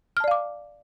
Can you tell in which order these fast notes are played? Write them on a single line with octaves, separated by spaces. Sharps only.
F6 A5 D5 F5 D6